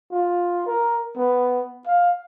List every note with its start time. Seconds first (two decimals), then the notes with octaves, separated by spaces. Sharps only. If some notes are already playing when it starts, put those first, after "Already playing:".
0.12 F4
0.66 A#4
1.17 B3
1.87 F5